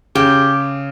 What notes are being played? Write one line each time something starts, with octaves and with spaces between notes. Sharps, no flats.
C#3 G4